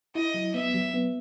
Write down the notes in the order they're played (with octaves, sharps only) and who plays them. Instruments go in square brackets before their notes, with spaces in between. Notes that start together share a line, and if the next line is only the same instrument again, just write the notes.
[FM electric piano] E4 [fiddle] D#5
[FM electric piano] F#3
[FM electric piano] B3 [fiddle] E5
[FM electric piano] F#3
B3